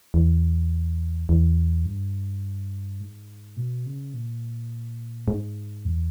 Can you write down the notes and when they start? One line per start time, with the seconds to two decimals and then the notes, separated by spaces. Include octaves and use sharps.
0.14 E2
1.29 E2
1.86 G2
3.00 G#2
3.57 B2
3.86 C#3
4.14 A#2
5.28 G#2
5.85 E2